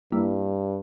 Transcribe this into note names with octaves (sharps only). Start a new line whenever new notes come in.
G2 G3 A#3 E4